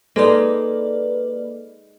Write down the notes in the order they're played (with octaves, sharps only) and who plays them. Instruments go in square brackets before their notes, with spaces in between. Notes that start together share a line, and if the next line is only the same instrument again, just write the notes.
[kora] G#3 D#4 [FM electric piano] A#3 B4 D5 [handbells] A4